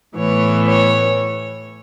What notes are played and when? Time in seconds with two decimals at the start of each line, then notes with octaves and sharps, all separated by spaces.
0.17 A2 E3 B3 C#5
0.64 C#5